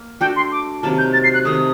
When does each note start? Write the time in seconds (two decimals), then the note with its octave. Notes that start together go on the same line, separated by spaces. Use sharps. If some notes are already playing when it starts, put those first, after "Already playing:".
Already playing: A#3
0.21 A3 D4 F#4 A4 G5
0.36 C6
0.52 D6
0.82 C3 D#3 F#3 A#3 A5
0.98 G6
1.13 A6
1.24 C7
1.34 F#6
1.45 C3 D#3 A3 D#6